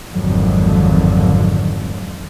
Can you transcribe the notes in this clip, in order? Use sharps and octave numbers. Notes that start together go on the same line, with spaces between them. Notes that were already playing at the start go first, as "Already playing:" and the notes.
G#1 F2 D3 D#3 F#3